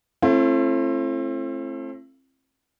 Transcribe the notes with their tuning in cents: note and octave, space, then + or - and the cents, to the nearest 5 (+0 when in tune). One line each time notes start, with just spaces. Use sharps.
A3 +0 C4 +35 E4 +45